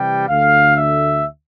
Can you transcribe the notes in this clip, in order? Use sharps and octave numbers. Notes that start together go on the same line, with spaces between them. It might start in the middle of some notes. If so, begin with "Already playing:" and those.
Already playing: C3 E3 G3 G5
D2 D3 A3 F5
E5